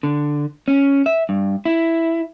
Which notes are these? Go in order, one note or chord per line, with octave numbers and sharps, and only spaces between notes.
D3
C#4
E5
G2
E4